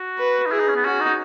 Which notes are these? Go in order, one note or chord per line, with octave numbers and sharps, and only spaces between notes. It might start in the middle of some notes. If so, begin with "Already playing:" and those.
Already playing: F#4
B4
D#4
E4 G#4
D#4
C#4
B3
C#4 F#4
D#4